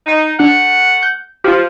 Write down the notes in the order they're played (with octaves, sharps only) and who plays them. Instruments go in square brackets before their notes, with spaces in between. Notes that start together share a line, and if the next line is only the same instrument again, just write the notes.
[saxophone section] D#4
[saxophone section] A3 F#5 [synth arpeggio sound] D4
[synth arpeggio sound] G6
[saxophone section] F3 [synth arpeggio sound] F4 G4